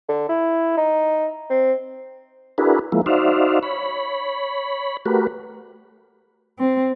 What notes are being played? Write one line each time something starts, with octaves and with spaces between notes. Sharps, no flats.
D3
E4
D#4
C4
D4 E4 F#4 G#4 A#4 B4
F3 G#3 A#3 E4
D#4 F#4 C5 D5 E5 F5
C#5 B5
A3 F#4 G4 A#4 B4
C4